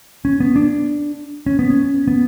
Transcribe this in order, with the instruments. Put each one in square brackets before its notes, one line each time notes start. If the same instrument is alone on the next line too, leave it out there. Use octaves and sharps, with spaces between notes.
[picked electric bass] C#4
B3
D4
C#4
B3
C#4
B3